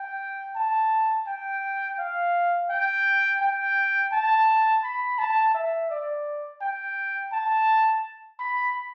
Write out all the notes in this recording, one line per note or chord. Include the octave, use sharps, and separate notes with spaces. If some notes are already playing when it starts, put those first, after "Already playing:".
Already playing: G5
A5
G5
F5
G5
G5
A5
B5
A5
E5
D5
G5
A5
B5